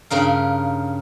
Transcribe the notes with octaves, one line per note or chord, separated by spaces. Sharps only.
G2 C#3 A#4 F5